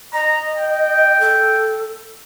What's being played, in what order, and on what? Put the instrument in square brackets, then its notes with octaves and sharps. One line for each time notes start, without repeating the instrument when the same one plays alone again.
[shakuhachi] D#5 [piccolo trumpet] A#5
[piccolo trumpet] G5
[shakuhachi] A4